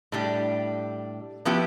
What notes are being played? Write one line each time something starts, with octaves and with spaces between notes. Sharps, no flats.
A2 G3 D4 G4
F3 B3 E4 G4